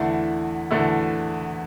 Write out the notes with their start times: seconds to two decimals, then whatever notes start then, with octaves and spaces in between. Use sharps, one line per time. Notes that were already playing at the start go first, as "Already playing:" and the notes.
Already playing: E2 D3 A3 E4
0.71 E2 D3 A3 E4